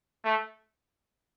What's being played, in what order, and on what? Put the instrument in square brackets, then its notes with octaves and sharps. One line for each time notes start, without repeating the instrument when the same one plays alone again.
[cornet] A3